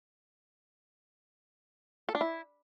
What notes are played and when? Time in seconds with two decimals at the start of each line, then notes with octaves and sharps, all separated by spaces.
2.09 A4
2.15 D4
2.21 E4